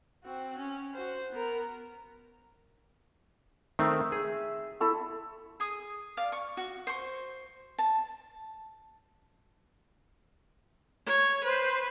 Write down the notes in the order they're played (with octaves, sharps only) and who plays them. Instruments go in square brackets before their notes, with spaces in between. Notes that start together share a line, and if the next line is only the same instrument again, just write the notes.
[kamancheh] C4 F#4
C#4
F#4 C5
B3 A#4
[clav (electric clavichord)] D#3 A3 C4 [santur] E5
[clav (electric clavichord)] G#4
[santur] E4 A4 C#6
[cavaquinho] G#4 D#6
D5 F5
C#6
F#4
C5 C#6
A5
[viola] C#5
[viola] B4 [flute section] C5